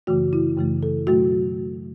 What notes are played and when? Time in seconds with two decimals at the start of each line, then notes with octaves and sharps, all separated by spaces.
0.07 F#2 C#3 E3 A3 F#4
0.33 E4
0.57 F#2 C#3 E3 A3
0.83 A4
1.07 B2 F#3 A3 F#4